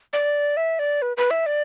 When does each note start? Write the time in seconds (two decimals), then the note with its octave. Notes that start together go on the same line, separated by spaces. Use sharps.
0.13 D5
0.57 E5
0.79 D5
1.02 B4
1.17 B4
1.31 E5
1.46 D5